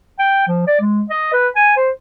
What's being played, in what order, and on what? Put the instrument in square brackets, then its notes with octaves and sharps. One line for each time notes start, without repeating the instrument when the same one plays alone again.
[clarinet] G5
F3
D5
G#3
D#5
B4
G#5
C5